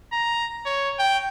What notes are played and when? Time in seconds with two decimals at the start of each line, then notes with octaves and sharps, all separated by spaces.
0.12 A#5
0.66 C#5
0.99 G5